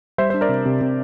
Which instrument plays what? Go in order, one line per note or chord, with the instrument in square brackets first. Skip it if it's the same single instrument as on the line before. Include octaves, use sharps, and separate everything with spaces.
[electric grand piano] G3 C5 E5
C5
D4
A#4 D5
C3
C3
C3